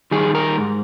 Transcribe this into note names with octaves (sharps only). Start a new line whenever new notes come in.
D#3 G3 G#4
A#4
G#2